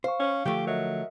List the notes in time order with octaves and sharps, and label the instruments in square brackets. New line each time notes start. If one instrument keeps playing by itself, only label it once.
[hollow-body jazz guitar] C5 [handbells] F5 C#6
[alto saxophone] C#4
[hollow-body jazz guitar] D3 F3 A3 [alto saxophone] G4
[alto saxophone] F#3 [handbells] A#4 D#5 E5